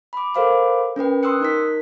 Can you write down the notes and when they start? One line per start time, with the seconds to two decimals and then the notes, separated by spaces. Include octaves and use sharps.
0.13 B5 D6
0.34 A4 A#4 C5 F5 B5 D6
0.96 C#4 A#4 B4 G5
1.23 C6 D#6 E6 F#6 C#7
1.40 D#4 A#4 B6